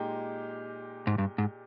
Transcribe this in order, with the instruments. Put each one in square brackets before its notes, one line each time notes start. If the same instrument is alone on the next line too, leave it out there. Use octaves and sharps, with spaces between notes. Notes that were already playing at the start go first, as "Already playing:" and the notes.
Already playing: [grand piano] A#2 G#3 D#4 G4
[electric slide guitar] G#2
G2
G#2